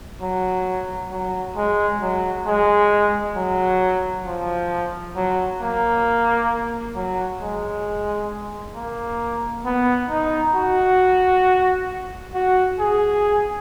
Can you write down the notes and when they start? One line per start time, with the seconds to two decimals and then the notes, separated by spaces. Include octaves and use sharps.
0.22 F#3
1.12 F#3
1.56 G#3
2.01 F#3
2.46 G#3
3.36 F#3
4.26 F3
5.16 F#3
5.61 A#3
6.96 F#3
7.40 G#3
8.75 A#3
9.65 B3
10.10 D#4
10.55 F#4
12.34 F#4
12.79 G#4